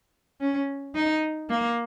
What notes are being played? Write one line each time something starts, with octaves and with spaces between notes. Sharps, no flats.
C#4
D#4
A#3